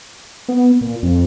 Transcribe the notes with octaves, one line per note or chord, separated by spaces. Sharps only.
B3
A#2
F2